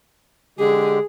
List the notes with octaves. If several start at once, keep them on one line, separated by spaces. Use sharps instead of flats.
D3 G#3 G4 G#4